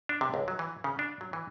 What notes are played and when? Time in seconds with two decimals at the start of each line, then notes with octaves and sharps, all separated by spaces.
0.09 D4
0.21 C3
0.34 C#2
0.48 F#3
0.59 E3
0.84 C#3
0.99 D4
1.21 F#3
1.33 E3